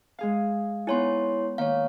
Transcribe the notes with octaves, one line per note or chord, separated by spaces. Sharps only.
G#3 G#4 F5
B3 D#4 E4 C#5 G#5 C6
D#3 A#3 C#5 F5